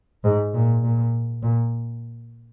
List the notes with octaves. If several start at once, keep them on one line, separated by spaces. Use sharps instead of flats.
G#2
A#2
A#2
A#2